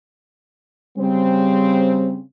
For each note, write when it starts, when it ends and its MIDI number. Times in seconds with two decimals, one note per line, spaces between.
0.97 2.21 49
0.97 2.18 55
0.97 2.21 60